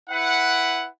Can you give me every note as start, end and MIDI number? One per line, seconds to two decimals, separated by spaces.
0.10 0.88 64
0.10 0.88 71
0.10 0.88 78